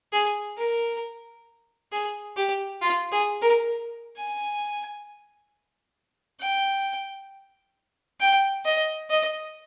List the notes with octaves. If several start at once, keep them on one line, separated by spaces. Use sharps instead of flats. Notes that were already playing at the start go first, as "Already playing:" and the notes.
G#4
A#4
G#4
G4
F4
G#4
A#4
G#5
G5
G5
D#5
D#5